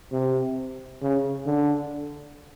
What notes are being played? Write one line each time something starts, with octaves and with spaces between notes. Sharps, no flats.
C3
C#3
D3